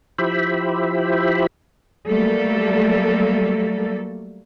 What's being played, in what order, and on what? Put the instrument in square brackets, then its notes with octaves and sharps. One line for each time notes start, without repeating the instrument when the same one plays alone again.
[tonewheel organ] F3 E4 G4 C5 E5 B5
[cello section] F#3 G3 A3 A#3 A4